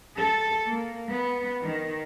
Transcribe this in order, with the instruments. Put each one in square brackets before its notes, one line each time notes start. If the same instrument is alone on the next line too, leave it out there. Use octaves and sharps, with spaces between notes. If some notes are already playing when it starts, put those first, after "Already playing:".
[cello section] A4
A#3
B3
D#3